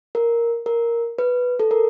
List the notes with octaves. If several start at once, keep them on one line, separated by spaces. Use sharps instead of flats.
A#4
A#4
B4
A4
A#4